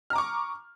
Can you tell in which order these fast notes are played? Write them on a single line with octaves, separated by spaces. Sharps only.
F6 A#5 D6 C#6